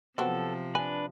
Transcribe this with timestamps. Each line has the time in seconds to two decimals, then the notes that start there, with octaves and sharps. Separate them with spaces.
0.18 C3 F3 F#3 B3 C4 A4
0.75 D4 B4 G#5